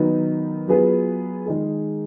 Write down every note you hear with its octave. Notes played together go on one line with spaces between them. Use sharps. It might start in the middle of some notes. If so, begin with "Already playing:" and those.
Already playing: D#3 F#3 B3 D#4
F#3 B3 F4 G#4 B4
D#3 G#3 D#4 G#4